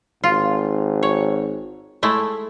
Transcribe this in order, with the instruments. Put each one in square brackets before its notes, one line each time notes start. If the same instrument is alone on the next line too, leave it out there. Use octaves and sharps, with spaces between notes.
[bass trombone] G#1 [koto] F4
[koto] C#5
G#3 A3 E4